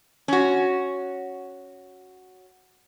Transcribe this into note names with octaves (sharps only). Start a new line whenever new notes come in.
C#4 F#4